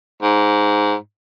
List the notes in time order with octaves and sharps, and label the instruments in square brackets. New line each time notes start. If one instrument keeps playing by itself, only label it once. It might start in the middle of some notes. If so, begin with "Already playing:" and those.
[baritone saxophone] G#2